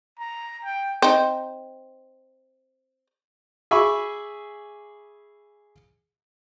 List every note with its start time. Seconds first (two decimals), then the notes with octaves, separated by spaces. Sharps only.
0.19 A#5
0.64 G5
1.02 C4 D#4
3.71 G#4 E5 B5 C#6 D6